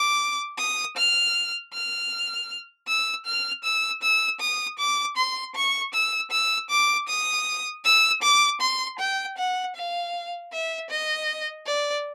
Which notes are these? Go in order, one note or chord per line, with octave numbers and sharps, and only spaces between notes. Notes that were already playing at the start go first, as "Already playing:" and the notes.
Already playing: D6
D#6
F6
F6
E6
F6
E6
E6
D#6
D6
C6
C#6
E6
E6
D6
D#6
E6
D6
C6
G5
F#5
F5
E5
D#5
D5